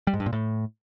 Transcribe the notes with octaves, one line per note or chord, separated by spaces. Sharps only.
G3
G#2
G2
A#2
A2